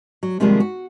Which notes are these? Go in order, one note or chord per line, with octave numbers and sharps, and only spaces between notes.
F#3
C3 D#3 F3 G3 G#3 A#3
F#4